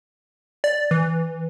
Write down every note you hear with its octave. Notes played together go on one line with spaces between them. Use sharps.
D5
E3